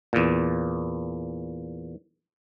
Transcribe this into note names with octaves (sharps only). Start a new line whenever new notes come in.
E2 A#2